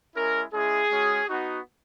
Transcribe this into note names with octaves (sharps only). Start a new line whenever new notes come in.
G#3 C#4 E4 A#4
G#3 C#4 E4 G#4
G#3 C#4 F#4
B3 D#4 F#4